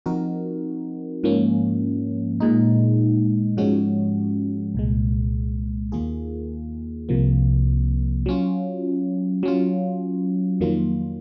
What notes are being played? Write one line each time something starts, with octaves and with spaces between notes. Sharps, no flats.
F3 C4 D#4 F#4 A#4
G#2 F3 A#3 C#4
A#2 G#3 D#4
G#2 F3 G#3 C#4 F#4
C2 A#2 G#3
D#2 D#3 A#3 F4 G#4
C2 C3 F3 A#3
F#3 C#4 F4
F#3 C#4 F4
F2 D#3 F#3 A#3 F4